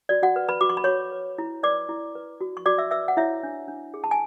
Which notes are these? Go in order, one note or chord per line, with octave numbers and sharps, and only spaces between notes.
F#4 D5
F#4 F#5
B4
B4 B5
F#4 D6
C#6
B5
F#4 C#5 C#6
B4
E4
B4 D5 D6
E4
B4
F#4
C#6
F#4 D5 D6
E5 E6
B4 E5 E6
F#5
E4 C#5 E5
D4
D4
G#4
A5
G#5